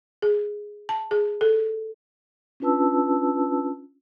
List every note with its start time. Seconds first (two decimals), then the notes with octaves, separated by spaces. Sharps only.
0.22 G#4
0.89 A5
1.11 G#4
1.41 A4
2.60 C#4 D4 F4 B4 A5 E6